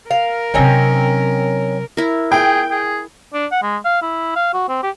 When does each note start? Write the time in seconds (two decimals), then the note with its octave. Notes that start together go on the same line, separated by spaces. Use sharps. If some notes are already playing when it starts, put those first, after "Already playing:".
0.11 A#4 F5
0.54 C3 F#3 C4 C#4 D#4
1.97 E4 A#4
2.32 G#4 G5
2.71 G#4
3.34 D4
3.51 F#5
3.63 G#3
3.85 F5
4.02 E4
4.36 F5
4.54 F#4
4.68 C4
4.83 G4